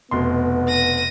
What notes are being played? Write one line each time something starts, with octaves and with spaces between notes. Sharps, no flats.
F1 B2 B3 C6
A#6 D#7